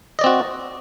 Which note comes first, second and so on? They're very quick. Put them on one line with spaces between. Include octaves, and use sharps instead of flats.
D#5 D5 C4 F#4